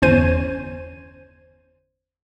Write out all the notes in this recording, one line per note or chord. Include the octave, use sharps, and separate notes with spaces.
G1 E2 C#4 C5 G#6 D#7